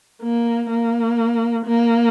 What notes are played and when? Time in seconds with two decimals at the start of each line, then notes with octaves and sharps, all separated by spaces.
0.23 A#3
0.70 A#3
1.66 A#3